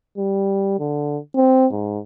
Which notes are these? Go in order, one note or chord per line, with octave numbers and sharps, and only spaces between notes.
G3
D3
C4
G#2